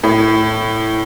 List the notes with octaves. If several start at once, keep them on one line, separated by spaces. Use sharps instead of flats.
A2